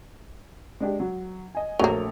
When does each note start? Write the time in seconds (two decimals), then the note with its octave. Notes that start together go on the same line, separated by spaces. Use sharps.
0.80 G#3 D4 G4
1.00 F#3
1.55 D#5 G#5
1.79 A#1 F#3 A3 A#3 F7